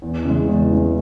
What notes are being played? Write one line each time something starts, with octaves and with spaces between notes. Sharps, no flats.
E2
C#3 E3 G#3
E2
C#3 E3 G#3